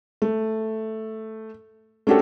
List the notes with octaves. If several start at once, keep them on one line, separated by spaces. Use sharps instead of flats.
A3
A3 C#4 D4 F#4 G4 A4